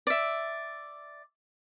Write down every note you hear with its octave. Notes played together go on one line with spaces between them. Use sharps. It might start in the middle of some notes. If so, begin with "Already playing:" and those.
D5 E5